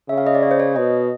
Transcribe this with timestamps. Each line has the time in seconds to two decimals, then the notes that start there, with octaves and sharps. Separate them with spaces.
0.09 C#3 E5
0.18 F5
0.27 D#5
0.35 D5
0.43 C#5
0.51 C5
0.60 C#5
0.76 B2 D#5